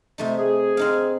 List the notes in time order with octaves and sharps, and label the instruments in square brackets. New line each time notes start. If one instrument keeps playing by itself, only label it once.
[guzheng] C3 A3 D#4
[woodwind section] G#4
[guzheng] C4 D#4 F5